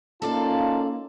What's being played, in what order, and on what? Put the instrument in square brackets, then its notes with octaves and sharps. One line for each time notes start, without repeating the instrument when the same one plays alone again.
[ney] A#3 [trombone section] C#4 D#4 F4 [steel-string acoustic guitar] A4 D5 F5 [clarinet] A5